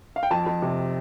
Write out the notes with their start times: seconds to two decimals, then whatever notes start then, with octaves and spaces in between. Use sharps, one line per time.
0.16 F5
0.23 G5
0.31 F2 A5
0.46 F2
0.62 C3